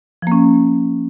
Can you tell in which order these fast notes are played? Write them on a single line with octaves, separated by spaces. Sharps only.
F3 A#3 C#4